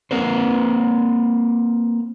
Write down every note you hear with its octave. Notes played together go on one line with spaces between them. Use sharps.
A#3 C4 A#4 C5